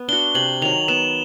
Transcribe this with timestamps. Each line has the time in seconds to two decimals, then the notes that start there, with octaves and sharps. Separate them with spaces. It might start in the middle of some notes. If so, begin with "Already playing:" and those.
Already playing: B3
0.08 D4 F#4 G7
0.35 C3 F#7
0.62 D#3 F#3 F7
0.88 B3 E7